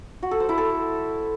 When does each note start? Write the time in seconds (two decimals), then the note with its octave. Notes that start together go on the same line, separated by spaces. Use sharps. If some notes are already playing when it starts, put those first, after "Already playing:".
0.23 F#4
0.31 A4
0.40 C5
0.49 E4
0.58 A4